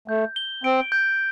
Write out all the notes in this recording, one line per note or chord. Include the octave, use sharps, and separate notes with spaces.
A3 G6
G7
C4 D7
G6